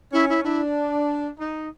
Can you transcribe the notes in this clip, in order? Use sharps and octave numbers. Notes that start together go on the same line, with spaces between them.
C#4 E4
E4
D4 E4
D#4